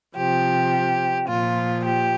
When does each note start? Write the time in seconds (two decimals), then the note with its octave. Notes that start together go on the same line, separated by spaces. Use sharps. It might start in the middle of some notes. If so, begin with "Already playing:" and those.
0.15 C3 F3 G4
1.28 A#2 F3 F4
1.85 G4